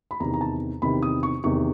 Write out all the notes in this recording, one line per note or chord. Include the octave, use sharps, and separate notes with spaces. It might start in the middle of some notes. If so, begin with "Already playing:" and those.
B5
E2 C3 D#3 A#5
A#5
A5
E2 C3 D#3 B5
D#6
C#6
E2 C3 D#3 C#6